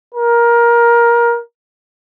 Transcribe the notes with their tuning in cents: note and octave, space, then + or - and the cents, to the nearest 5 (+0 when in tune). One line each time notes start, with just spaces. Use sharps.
A#4 +20